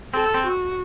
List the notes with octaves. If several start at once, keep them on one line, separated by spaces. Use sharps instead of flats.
C4 A4
C4
F#4